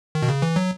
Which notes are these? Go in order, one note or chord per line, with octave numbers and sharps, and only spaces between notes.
D#3
B2
C#3
E3
F#3